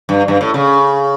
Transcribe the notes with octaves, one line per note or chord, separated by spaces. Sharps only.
G2
G2
A2
C#3